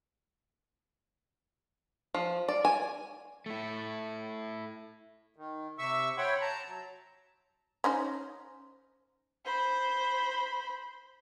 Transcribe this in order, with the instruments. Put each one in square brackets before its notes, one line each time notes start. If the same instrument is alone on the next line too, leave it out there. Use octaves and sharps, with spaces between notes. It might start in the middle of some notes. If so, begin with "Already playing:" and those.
[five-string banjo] F3
D5
G#5
[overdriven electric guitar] A3 E4
[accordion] D#3
C3 E5 C#6 E6
C#5 E5 F#5 G5 B5 C6
A5 A#5
F#3
[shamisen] C#4 D#4 C5
[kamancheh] C5 B5